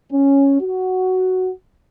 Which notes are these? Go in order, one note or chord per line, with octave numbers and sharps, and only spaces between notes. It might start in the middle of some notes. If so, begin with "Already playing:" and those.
C#4
F#4